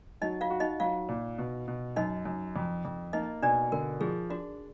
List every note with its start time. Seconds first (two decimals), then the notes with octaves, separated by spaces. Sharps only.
0.22 F#3 D#4 D#5
0.41 F4 F5
0.50 F#4
0.60 D#4 D#5
0.80 F#3 F4 F5
1.09 A#2
1.38 B2
1.68 B2
1.96 F#2 D#4 D#5
2.25 F#2
2.56 F2
2.85 F2
3.13 A#3 D#4 D#5
3.42 B2 D4 D5
3.72 D3 A#4
4.01 F3 G#4
4.30 D4 F#4